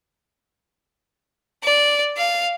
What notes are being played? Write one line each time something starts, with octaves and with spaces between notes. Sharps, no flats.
D5
F5